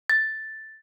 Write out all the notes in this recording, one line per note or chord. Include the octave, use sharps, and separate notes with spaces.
A6